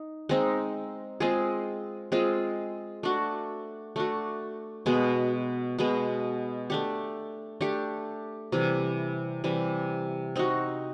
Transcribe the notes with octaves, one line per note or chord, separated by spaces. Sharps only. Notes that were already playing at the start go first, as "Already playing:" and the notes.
Already playing: D#4
G#3 C4 D#4
G#3 C4 F4 G#4
G#3 C4 F4 G#4
A3 D4 F#4
A3 D4 F#4
B2 G#3 B3
B2 G#3 B3
A3 D4 G4
A3 D4 G4
C3 E3 G3
C3 E3 G3
C4 D#4 F#4